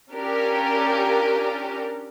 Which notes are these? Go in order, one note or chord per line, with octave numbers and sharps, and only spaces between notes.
C#4 D4 F4 G4 A#4